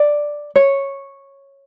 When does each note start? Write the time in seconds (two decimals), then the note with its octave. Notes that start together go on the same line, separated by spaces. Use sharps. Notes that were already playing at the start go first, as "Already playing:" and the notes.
Already playing: D5
0.56 C#5